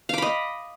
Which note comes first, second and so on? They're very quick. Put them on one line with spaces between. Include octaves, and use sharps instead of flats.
F5 D6 B5 D#5